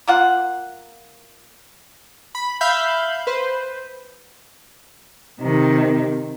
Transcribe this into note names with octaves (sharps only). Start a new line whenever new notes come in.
A#3 F4 F#5
B5
E5 F5 B5 G6
B4 C5
C3 D#3